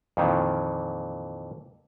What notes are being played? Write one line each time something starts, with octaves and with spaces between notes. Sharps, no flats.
F2 A#2 D#3 E3